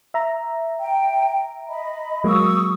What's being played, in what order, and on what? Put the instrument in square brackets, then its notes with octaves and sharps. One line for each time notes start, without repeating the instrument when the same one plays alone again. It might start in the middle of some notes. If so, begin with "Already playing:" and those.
[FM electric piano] E5 A#5
[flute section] G5
D#5 B5
[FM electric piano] F#3 G#3 A#3 [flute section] C#6 D#6 E6